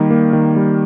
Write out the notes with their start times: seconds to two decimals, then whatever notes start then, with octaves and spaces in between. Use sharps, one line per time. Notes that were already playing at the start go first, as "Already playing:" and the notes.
Already playing: D#3 G3 A#3
0.10 A#3
0.33 D#3
0.56 G3